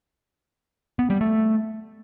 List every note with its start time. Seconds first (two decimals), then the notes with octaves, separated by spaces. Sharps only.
0.99 B3
1.10 G3
1.21 A3